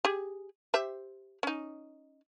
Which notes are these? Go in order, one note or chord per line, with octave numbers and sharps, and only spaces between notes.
G4 G#4
G4 C5 E5
C#4 D#4